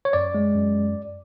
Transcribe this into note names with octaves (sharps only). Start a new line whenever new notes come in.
C#5
F#2 D5
G#3
F#2